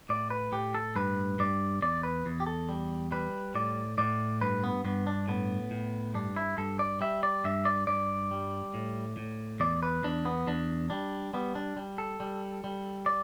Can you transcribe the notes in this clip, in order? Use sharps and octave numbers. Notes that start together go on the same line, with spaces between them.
A2 D5
B4
A2 G4
A4
G2 B4
G2 D5
E2 D5
B4
E2
G4
A4
G3
G3 B4
A2 D5
A2 D5
G2 B4
B3
G2 B3
D4
A2 B3
A2
G2 D4
E4
G2 A4
D5
G3 E5
D5
G2 E5
D5
G2 D5
G3
A2
A2
E2 D5
B4
E2 D4
B3
E2 D4
G3 D4
G3 B3
D4
G3
A4
G3
G3
D5